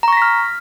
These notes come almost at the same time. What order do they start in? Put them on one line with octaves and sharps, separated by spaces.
A#5 C#6 A#6 B6 F6